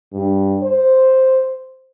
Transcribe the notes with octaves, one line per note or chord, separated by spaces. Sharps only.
G2
C5